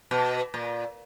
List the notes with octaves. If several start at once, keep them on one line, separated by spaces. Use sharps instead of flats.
B2
A#2